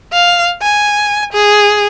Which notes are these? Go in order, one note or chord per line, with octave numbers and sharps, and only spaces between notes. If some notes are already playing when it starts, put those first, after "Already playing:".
F5
G#5
G#4